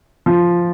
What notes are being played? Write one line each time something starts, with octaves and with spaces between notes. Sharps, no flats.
F3